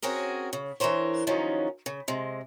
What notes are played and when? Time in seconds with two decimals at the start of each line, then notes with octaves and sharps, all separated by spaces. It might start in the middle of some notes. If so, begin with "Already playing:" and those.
0.02 C4 C#4 F#4 G#4 A#4
0.53 C#3
0.80 E3 D4 A#4 C5 C#5
1.27 D#3 F3 F#3 C#4 D#4
1.86 C#3
2.08 C3 G#3